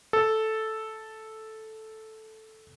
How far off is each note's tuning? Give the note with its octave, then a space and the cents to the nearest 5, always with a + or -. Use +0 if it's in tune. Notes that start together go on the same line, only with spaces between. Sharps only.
A4 -5